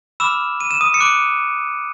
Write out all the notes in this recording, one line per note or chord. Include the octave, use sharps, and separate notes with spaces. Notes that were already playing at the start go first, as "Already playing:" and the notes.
B5 D6 E6 F6 E7
D#7
E7
D#6 D#7
C#7
C6 D6 D#6 F#6 D7